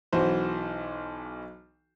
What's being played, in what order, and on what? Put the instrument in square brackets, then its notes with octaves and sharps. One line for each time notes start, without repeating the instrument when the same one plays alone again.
[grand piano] B1 E3 F#4 C5